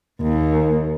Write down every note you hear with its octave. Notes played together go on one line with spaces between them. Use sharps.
D#2